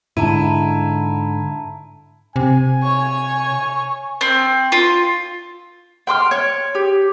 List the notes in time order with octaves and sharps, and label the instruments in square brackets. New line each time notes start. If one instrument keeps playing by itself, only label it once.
[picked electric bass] G#2 D3 [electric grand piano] E4 [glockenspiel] A5 A#5 D#7
[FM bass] C3 [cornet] G#5
[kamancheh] C#5 C#6
[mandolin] C4
F4
G5 C6 D6 F6
C#5
G4